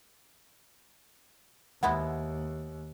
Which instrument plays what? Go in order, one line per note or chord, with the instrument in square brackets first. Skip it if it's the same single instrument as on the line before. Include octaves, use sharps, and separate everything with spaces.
[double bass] D#2 [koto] G#3 B3 E4 [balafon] F#5